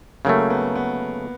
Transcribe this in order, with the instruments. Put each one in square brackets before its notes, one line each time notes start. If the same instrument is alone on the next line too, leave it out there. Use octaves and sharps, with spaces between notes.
[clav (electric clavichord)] C#3 F#3 A3 [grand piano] A#3
[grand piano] B3
B3